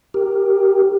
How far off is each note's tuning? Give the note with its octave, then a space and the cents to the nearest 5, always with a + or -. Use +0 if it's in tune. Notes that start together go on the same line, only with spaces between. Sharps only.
G4 +0 A#4 +0